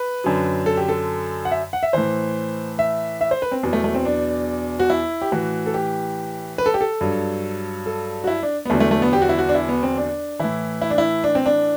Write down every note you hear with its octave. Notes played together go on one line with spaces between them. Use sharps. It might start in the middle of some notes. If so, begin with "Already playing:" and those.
Already playing: B4
F#2 D3 F#3
A4
G4
A4
F#5
E5
F#5
E5
A2 E3 C5
E5
E5
C5
B4
C4
E2 B2 F#3 B3
A3
A3
C4
D4
F#4
E4
G4
A2 E3 F#4
A4
G4
B4
A4
G4
A4
G2 F#3
A4
F#4
E4
D4
B3
E2 D3 F#3 A3
A3
A3
B3
G4
F#4
E4
F#4
D4
E4
B3
C4
D4
A2 E3 E4
E4
D4
E4
D4
C4
D4